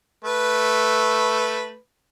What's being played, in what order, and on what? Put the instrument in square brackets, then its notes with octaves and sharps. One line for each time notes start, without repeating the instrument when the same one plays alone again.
[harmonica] A3 B4